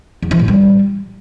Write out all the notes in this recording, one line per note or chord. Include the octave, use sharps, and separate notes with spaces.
E2
E3
A2
G3